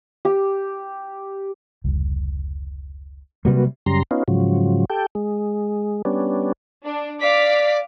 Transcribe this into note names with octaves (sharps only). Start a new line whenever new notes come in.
G4
F1 C#2 G3
C3 F#3 G3 A#3 C4 F#4 B4
F#2 C#3 G3 A#5 C6
B3 C#4 D#4 F4
G#2 C#3 F3 F#3
G4 A4 G5
G#3
G3 B3 C#4 D4
D4
D5 F5 D6 B6